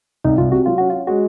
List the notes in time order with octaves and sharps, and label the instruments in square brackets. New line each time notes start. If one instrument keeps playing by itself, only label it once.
[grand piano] C2 [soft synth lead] D#4
[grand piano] C2 [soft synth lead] F4
[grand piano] C3 [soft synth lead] F#4
[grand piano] F#3 [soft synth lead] F4
[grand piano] C#4 [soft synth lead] F#4
[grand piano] C#4 [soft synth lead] F4
[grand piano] G#3 [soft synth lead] F#4